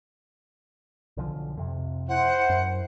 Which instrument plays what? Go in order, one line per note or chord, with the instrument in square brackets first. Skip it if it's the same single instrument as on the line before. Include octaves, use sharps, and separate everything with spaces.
[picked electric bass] B1 D3 F3
F2 C3
[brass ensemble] E4 C5 [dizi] F#5
[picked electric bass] F#2